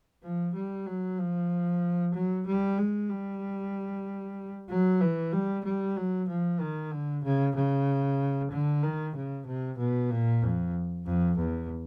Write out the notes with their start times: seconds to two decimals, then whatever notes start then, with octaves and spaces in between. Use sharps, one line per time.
0.23 F3
0.55 G3
0.87 F#3
1.18 F3
2.14 F#3
2.47 G3
2.78 G#3
3.10 G3
4.70 F#3
5.01 E3
5.33 G3
5.64 G3
5.96 F#3
6.28 F3
6.60 D#3
6.91 D3
7.24 C#3
7.55 C#3
8.51 D3
8.83 D#3
9.15 C#3
9.46 C3
9.79 B2
10.10 A#2
10.42 F2
11.06 F2
11.38 E2